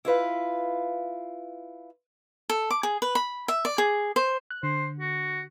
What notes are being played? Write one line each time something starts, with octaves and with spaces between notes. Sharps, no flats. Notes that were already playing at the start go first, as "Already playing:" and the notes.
E4 F4 B4 F5
A4
D6
G#4
B4
B5
E5
D5
G#4
C5
F#6
D3 C5
F#4